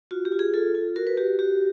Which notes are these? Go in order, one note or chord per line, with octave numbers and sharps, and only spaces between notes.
F4 F#4
G4
F4
G#4
F4 A4
F4
F#4 A#4
B4
F#4 G4
F#4 G4